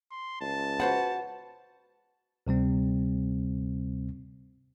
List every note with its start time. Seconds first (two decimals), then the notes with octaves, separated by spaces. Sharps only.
0.11 C6
0.41 C#2 A5
0.80 F#4 B4 C5 F#5
2.47 D2 C3 G3 C4